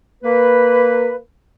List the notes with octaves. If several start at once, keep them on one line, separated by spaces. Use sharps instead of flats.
A#3 B4